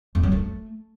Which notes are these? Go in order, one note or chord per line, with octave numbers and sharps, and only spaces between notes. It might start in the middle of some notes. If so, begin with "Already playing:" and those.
F2
F#3
A3